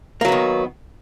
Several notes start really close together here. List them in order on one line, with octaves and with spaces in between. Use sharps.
A#3 F#3 B3 D#3